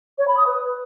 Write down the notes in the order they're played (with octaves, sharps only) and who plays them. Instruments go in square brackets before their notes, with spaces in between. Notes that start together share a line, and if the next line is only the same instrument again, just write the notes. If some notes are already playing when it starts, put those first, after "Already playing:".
[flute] C#5
B5
D#6
B4